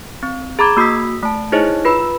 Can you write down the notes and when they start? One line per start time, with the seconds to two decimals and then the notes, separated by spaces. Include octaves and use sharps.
0.23 C4
0.59 G#4 A#5 B5 D6 G#6
0.77 A#3 F#4 D#6 E6 B6
1.23 A3 A5
1.52 D#4 E4 G#4 C5 C#5 D#5
1.85 F4 B4 B5 E6